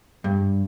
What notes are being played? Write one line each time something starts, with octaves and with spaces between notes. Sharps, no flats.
G2